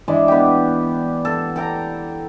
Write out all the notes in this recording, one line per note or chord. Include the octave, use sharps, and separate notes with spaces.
E3 G#3 D4
B3 G4
A4
A4 G5 A#5